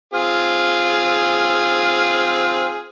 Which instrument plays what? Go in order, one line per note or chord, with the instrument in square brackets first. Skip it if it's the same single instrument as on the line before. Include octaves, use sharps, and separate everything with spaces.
[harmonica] C4 F4 G#4 [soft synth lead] F6